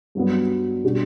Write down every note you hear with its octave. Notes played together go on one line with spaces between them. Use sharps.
G2 F#3 B3
B2 G3 D4 F#4